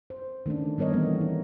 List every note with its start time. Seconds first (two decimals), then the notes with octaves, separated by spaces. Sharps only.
0.10 C5
0.46 D#3 A3 C#4 D4
0.78 G3 B3 A#4 C#5 D#5
0.93 E3 A3 A#3 C4
1.21 D#4